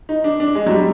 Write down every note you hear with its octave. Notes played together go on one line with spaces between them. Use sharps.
D#4
D4
D4
G#3
F#3
G3